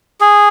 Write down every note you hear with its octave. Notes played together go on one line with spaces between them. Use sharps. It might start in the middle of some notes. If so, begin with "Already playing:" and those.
G#4